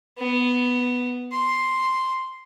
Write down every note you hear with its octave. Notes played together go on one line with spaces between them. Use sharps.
B3
C6